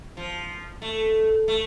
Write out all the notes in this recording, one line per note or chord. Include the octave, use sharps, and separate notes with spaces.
F3
A3
A3